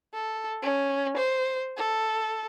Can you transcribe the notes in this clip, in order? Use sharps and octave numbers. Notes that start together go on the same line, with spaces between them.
A4
C#4
C5
A4